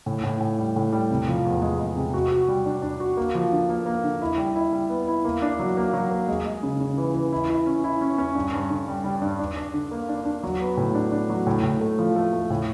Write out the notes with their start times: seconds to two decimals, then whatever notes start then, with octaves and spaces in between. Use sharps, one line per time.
0.06 A2
0.23 A2
0.41 A2
0.59 G3
0.76 A2
0.92 G3
1.11 C3
1.28 F3
1.45 E2
1.62 G#3
1.79 G#3
1.96 C3
2.14 F#4
2.31 F#4
2.48 G3
2.65 D4
2.82 D4
3.00 F#4
3.17 A#3
3.35 F3
3.52 D3
3.69 A#3
3.86 A#3
4.04 D3
4.22 E4
4.38 G3
4.56 E4
4.72 G3
4.90 B3
5.08 E4
5.25 A#3
5.42 D4
5.59 F#3
5.77 A#3
5.93 F#3
6.11 A#3
6.28 G#3
6.46 G#3
6.63 C#3
6.80 C#3
6.98 E3
7.14 E3
7.32 E4
7.49 E4
7.66 C#4
7.84 E4
8.01 C#4
8.18 C#4
8.35 G2
8.53 G2
8.70 D3
8.88 G3
9.04 G3
9.22 G2
9.39 D4
9.57 D4
9.74 D3
9.91 A#3
10.09 D4
10.25 D4
10.43 F#3
10.61 B3
10.77 A2
10.95 D4
11.12 D4
11.30 F#3
11.47 A2
11.63 A2
11.81 A3
11.99 F3
12.16 A3
12.33 A3
12.50 A2